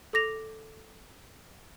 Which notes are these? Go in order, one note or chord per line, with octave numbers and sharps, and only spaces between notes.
A4 D6 A#6 F7